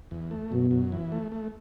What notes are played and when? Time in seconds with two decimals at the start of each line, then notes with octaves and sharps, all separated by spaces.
0.11 E2
0.31 A3
0.51 F#2 B2
0.71 F#2
0.92 E3
1.12 A3
1.32 A3